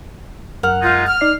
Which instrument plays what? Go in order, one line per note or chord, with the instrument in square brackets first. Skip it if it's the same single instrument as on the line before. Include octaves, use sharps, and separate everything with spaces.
[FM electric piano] F#2 A#4 F6 [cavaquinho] F#5
[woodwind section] G#3 D#4 F4
F6
[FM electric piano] D#4 D5 C7